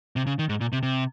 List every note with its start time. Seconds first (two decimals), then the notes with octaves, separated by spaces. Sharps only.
0.16 C3
0.27 C#3
0.39 D#3
0.49 G#2
0.61 A#2
0.73 C3
0.83 C3